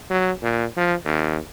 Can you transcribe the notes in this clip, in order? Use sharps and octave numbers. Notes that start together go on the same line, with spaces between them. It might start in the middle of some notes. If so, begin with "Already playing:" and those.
F#3
A#2
F3
D#2